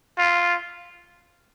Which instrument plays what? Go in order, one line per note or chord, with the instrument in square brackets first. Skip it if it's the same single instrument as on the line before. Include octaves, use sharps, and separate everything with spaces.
[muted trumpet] F4